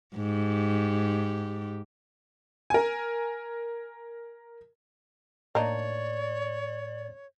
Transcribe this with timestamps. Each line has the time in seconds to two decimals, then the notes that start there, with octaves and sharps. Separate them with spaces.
0.16 G#2 G4
2.70 A#4 G#5
5.55 A2 A#3 D4 D#4 C#5 D5